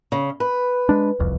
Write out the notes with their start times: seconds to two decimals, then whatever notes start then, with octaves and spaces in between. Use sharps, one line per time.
0.12 C#3
0.40 B4
0.89 G#3 D4
1.19 E1 C2 F2